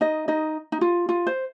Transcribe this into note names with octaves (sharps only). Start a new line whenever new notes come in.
D#4 D#5
D#4 D#5
D#4
F4
F4
C5